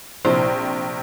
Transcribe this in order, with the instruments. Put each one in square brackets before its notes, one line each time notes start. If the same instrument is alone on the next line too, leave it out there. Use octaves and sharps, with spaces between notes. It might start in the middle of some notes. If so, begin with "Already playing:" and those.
[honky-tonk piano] A#1 C3 [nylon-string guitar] C5